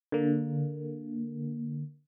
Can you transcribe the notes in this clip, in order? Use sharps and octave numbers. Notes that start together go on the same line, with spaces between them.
D3 A#3